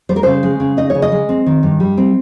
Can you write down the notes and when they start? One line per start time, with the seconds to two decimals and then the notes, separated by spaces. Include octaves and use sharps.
0.09 G3 C5
0.16 A#4
0.23 C#3 C5
0.43 G#3
0.60 C#3
0.77 D#4 D#5
0.90 C#5
0.95 C#3
1.02 D#5
1.12 G#3
1.29 C4
1.46 D#3
1.63 G2
1.80 G3
1.97 C4